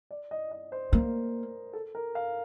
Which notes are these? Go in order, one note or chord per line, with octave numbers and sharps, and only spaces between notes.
D5
D#5
D#5
C5
A#3 A#4
A4
A#4
F5